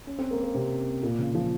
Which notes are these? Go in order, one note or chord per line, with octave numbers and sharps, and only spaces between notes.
C#4
C4
A#3
A#3
C3
A#2
C#3
F3